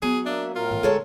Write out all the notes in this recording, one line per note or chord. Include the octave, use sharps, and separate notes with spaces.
F#3 B3 G#4
A#3 D4 E5
A2 F4 A#4
G#2 E3
D3 G#3 A4 C#5